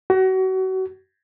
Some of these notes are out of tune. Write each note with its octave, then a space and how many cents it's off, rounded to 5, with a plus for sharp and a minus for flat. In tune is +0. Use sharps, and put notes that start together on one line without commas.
F#4 +30